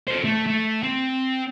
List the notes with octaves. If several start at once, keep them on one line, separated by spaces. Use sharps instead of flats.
A4 C5
A3
A3
C4